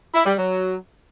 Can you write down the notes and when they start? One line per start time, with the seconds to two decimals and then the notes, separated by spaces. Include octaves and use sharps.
0.14 E4
0.25 G3
0.37 F#3